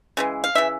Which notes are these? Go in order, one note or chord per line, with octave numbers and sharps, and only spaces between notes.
C#3 E3 G#3
F5
C#3 E3 E5